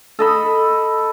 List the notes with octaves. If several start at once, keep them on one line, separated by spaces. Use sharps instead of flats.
A4 D#5 B5